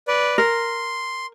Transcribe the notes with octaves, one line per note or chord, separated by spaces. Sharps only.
B4 D5
A#4 C6